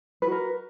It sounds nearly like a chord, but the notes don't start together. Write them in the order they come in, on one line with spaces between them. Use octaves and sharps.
B4 F#4 A#4